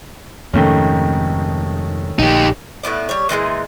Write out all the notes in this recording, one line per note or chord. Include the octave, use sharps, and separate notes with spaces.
F2 G#2 C3 D#3 A3 C#4
A#1 D#4 G4
A2 B3 E4 D5
G3 C#5
A#2 E3 G3 G#3